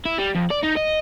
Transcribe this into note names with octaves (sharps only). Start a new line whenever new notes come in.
E4
G3
F2
D5
D#4
D#5